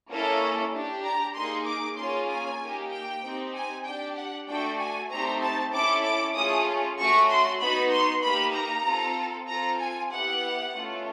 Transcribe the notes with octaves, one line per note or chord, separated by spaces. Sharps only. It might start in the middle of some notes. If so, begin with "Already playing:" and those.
A#3 C#4 E4 A4
D4 G4
A#5
A#3 D#4 G#4 C6
D6
A#3 C#4 F4 G#4 C6
G#5
A#3 D#4 G4
G5
C4 D#4 G4
G#5
D4 G4 G5
F#5
A3 D4 F#4 A4 G5
G#5
A3 C4 D#4 G4 A#5
A5
C#4 E4 A4 D6
D6
A3 C#4 F4 G#4 D#6
A3 C#4 F#4 C#6
C6
B3 D#4 F#4 B5
C6
A#3 D#4 G4 B5
A#5
C4 F4 A4
C4 F4 A4 A#5
G#5
B3 E4 G4 F#5
A3 C#4 F4